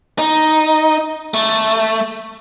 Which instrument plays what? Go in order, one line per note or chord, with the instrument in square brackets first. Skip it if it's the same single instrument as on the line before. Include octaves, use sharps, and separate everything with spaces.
[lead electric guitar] D#4
A3